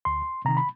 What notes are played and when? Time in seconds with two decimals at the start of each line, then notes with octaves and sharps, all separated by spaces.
0.05 D2 C6
0.45 C3 D#3 A#5
0.57 B5